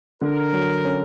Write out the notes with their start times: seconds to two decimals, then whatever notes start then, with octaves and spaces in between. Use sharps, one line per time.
0.21 D3 A#4
0.53 F#3
0.84 C#4